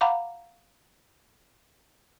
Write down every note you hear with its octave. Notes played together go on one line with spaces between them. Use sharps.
F5 F#5 A#5 B5 D6